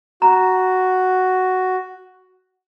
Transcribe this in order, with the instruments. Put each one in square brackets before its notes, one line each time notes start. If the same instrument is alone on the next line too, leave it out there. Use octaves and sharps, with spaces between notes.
[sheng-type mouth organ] F#4 [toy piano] A#5